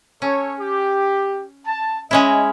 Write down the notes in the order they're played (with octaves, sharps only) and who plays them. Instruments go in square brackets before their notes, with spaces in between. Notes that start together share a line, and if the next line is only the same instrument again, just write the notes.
[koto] C#4 [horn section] A4 C#5
[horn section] G4
A5
[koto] G#3 C#4 E4 [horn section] D#5